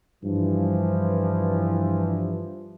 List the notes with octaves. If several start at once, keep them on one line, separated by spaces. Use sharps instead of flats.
G2 E3 F3